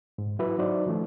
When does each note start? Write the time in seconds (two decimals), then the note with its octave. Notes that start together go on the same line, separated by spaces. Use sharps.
0.18 G#2
0.39 F#3 E4 F#4 B4 E5
0.58 F#3 D#4 F#4 C5 D5
0.86 D#3 F3 A3 C#4